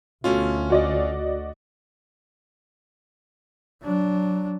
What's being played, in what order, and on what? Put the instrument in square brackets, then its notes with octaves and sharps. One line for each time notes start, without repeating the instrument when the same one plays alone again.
[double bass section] D2 [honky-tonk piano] B2 [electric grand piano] A3 C#4 F4
[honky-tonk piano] F#4 D5 D#5
[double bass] F#3 D4